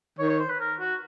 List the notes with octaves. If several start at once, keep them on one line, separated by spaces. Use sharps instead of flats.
D#3 C#5
C#5
C5
B4
A#4
F#4